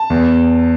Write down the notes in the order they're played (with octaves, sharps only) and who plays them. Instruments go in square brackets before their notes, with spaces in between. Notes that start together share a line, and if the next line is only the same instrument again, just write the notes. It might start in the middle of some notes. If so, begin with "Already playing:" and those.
Already playing: [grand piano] A5
E2